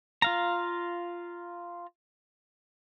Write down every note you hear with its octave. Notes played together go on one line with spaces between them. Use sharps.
F4 F5 A#5